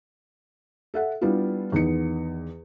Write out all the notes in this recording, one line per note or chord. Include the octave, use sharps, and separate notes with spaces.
A4 E5 F#5
G3 B3 D4 E4 F4
E2 D#3 B3 D#4 C#7